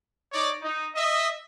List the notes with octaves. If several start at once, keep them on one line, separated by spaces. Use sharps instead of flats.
D#4 C#5 D5
D#4
D#5 E5